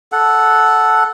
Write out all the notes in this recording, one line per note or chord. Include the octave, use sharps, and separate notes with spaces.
A4 F#5